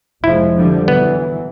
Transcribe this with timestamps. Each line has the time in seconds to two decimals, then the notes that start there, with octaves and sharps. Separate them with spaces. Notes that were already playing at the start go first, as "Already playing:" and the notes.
0.24 F1 F3 G#3 E4
0.56 D3 F3 G3
0.88 E3 F#3 B3